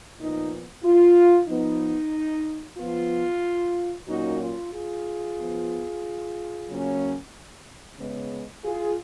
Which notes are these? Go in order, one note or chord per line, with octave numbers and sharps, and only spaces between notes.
A#2 F3 B3 D#4
F4
F3 B3 D#4
F3 B3 F4
A#2 F#3 A#3 C#4 D#4 F#4
F4
F4 G#4
F3 B3
C#3 F#3 A#3 C#4
C#3 G#3 B3
F4 G#4